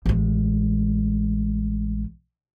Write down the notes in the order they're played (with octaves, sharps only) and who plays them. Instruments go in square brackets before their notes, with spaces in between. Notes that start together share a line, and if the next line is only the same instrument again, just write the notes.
[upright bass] A1 G#3